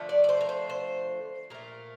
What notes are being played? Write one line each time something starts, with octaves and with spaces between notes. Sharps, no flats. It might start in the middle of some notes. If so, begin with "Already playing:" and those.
Already playing: D3 F3 A3
D5
D5
C5
A#4
C5
C5
A#2 A3 A#4